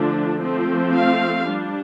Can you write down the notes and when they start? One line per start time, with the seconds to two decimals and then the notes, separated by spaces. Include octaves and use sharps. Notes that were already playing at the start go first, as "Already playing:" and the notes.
Already playing: D3 F3 A3 D4
0.38 F3 A3 C4
0.93 F5
1.48 G3 D4